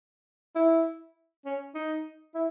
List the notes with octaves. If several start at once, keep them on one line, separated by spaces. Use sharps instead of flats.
E4
C#4
D#4
E4